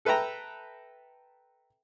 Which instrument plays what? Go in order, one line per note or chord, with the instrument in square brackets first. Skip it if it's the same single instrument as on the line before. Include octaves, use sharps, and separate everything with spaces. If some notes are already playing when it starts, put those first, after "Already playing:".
[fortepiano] A4 B4 E5 G5 A#5